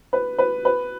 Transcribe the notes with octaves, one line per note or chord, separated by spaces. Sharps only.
B4
B4
B4